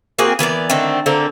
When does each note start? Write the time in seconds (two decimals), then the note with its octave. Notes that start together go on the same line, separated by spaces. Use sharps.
0.19 A#3 C4 F#4 G#4
0.39 E3 B3 A#4 D5
0.70 D3 D#3 A3 C4
1.06 D3 A#3 C4